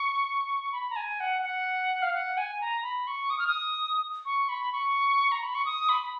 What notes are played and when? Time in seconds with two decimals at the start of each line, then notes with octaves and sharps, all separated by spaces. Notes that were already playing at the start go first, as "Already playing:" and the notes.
Already playing: C#6
0.72 B5
0.90 A#5
0.96 G#5
1.20 F#5
1.42 F#5
2.02 F5
2.13 F#5
2.37 G#5
2.61 A#5
2.83 B5
3.07 C#6
3.30 D#6
3.39 F6
3.47 D#6
4.25 C#6
4.49 B5
4.72 C#6
5.32 A#5
5.43 B5
5.55 C#6
5.65 D#6
5.89 B5
6.03 B5